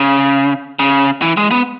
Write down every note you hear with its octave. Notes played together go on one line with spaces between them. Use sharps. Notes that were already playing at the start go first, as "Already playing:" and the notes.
Already playing: C#3
C#3
E3
G#3
B3